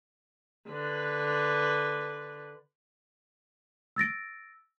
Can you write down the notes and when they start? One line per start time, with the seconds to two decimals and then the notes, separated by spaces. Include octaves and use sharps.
0.69 D3 B4
3.96 E6 A6 A#6 D7